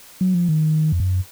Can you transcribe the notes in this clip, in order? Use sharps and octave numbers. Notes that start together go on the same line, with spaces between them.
F#3
F3
D#3
F2
F#2